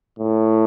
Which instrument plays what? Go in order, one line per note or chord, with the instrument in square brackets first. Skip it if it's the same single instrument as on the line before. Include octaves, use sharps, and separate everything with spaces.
[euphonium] A2